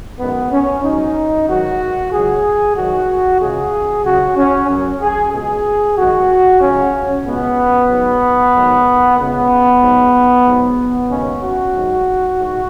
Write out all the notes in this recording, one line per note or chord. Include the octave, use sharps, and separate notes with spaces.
F#2 D#3 G#3 B3
C#4
G#2 F#3 D#4
G#2 D#3 F#3 F#4
C#2 C#3 F#3 G#4
G#2 D#3 F#3 F#4
C#2 C#3 G#3 G#4
C#2 C#3 F#3 F#4
C#4
F#2 F#3
G#4
C#2 B2 G#3 G#4
F#2 D#3 G#3 F#4
C#2 C#3 F#3 C#4
C#2 B2 G#3 B3
G#2 F#3
G#2 D#3 F#3
C#2 C#3 G#3 B3
G#2 F#3
G#2 F#3
D#2 C#3 G#3 C#4
F#4
G#2 F#3
G#2